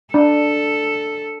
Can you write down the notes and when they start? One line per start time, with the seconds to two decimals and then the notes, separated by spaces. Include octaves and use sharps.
0.14 D4 A4